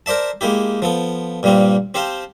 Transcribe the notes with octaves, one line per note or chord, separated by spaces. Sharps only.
A#4 C5 D5 E5 A5
G#3 A#3 E4 G4
F3 B3 A4
G2 A#2 G3 A#3 C4
C4 G4 C5 F5 A5